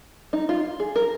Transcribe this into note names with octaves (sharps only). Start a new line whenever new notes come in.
D#4
F4
G#4
A#4